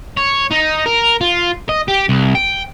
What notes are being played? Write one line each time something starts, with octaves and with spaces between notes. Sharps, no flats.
C#5
D#4
A#4
F4
D#5
G4
C2
G5